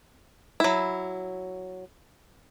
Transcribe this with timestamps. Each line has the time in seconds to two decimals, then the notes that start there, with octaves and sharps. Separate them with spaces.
0.60 F#3 E4